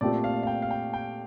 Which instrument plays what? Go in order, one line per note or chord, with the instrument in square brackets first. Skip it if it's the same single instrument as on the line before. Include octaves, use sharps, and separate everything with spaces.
[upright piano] A#2 A3 C4 G4 [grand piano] D5
[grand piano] F5
F5
G5
F5
G5
G5